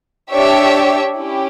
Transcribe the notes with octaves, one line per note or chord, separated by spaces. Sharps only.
D4 G4 C#5 E5
C#4 E4 G4